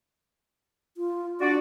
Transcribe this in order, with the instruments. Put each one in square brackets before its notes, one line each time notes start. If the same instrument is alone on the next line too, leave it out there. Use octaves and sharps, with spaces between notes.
[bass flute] F4
[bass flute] D4 [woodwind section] F#4 D5